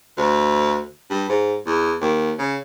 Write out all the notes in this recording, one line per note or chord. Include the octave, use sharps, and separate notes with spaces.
D2
G2
G#2
E2
D#2
C#3